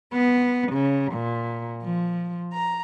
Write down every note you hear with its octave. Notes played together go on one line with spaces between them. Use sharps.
B3
C#3
A#2
F3
A#5